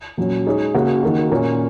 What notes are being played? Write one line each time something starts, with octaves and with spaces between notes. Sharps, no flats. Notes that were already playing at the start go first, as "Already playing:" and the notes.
A#2 F#3 C#4
G#3 D#4 G#4 C#5
C#3 A#3 F#4 A#4
D#3 A#3 F#4
A#2 A#3 C#4